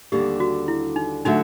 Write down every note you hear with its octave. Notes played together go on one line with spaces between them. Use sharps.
D#2 D3 G3 G4
F#4
E4
D#4
D3 F#3 A3 D#4